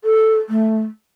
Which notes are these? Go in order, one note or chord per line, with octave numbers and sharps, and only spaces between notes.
A4
A3